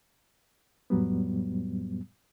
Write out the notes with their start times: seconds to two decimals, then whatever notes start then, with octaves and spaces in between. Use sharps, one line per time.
0.90 F2 A2 F#3 G3 B3